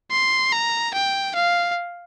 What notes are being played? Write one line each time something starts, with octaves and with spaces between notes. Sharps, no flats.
C6
A#5
G5
F5